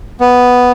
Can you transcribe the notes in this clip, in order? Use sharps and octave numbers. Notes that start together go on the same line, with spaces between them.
B3